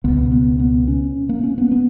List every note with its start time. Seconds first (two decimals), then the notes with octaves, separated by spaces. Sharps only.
0.04 C#2 B2 B3
0.32 B3
0.59 B3
0.88 C#4
1.29 A#3
1.43 C#4
1.58 B3
1.71 B3